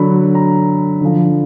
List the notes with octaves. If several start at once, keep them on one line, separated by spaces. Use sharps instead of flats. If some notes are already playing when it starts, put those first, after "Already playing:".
Already playing: D3 F#3 B5
A#5
D3 F3